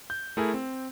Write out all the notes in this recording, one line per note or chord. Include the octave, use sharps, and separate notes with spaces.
G6
A3 E4 G#4 A#4 G#5
C4